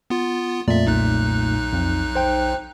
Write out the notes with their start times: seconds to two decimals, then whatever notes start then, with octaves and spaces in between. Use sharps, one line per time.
0.10 B3 F4
0.68 F2 A#2 A3 D5 E5
0.86 B1 D#4 F#6
1.72 F2
2.15 C5 G5